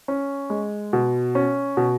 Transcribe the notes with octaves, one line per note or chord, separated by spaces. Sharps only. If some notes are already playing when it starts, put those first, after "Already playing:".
C#4
G#3
B2
C#4
B2